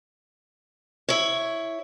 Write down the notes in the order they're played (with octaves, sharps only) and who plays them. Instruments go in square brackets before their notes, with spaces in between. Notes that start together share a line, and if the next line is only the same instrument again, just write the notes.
[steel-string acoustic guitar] E4 C#5